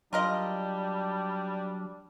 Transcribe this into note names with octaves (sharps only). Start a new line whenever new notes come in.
F#3 G3 D4 F4 A#4 D#5